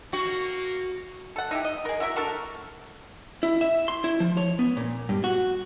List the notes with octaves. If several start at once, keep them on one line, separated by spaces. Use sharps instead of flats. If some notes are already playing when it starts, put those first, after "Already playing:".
A#3 F#4
A4 F#5
D#4 E4 G4
D#5
G#4 A#4
E4 F#4 A#4 E5
D4 F#4 A4 A#4
E4
E5
C6
E4
F3
C#5
B3
A#2
G2
F#4